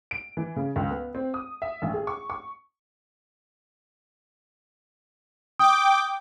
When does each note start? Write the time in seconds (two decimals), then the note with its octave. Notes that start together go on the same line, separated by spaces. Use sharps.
0.11 D7
0.37 E3
0.56 C#3
0.76 C#2
0.91 B3
1.15 C4
1.34 D#6
1.62 E5
1.82 A1
1.94 G#4
2.07 C#6
2.30 C#6
5.59 G5 D6 D#6